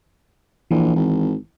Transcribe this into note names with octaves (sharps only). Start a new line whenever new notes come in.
A#1 E3
G#1